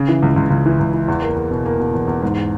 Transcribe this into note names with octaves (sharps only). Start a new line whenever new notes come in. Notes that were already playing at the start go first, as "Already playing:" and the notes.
Already playing: C#3
E3
C#2
C#2
C#2
E3
C#2
E3
E2
A#3
E2
B2
A#3
B2
E2
E2
G#2